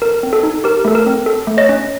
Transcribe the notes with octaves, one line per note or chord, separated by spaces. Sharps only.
A4 A#4
C4
A4
D#4
G4 A#4
A3 A4
A#4
C4
A4
A3
C#5 D#5
C#4